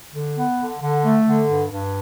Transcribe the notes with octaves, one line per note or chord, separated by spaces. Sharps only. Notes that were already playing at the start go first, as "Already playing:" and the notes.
D3
B3
D3
D3
A3
D3
G2
G2